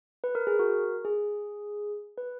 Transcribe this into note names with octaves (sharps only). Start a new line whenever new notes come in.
B4
A#4
G#4
F#4 A#4
G#4
B4